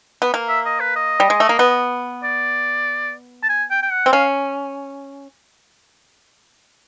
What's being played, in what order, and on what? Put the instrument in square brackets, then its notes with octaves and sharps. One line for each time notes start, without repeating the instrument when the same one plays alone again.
[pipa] B3
A#3
[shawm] E5
D#5
B4
D#5
[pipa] G3
G#3
A3
A#3
B3
[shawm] D5
A5
G#5
G5
G5
F#5
[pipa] C4
[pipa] C#4 [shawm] F5